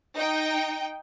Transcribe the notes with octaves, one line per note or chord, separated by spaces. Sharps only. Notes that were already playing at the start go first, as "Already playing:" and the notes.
D#4 G5